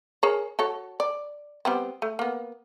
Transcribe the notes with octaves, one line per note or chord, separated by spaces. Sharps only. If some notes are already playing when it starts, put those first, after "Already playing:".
G#4 A#4 C#5
F#4 A4 C#5
D5
G3 B3 C4
A3
A#3 B3